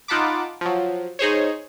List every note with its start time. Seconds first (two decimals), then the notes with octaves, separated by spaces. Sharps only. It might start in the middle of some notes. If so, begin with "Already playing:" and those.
0.08 D#4 F4 F#5 A5 B5 D6
0.61 F3 F#3
1.19 D#4 G#4 C5 C#5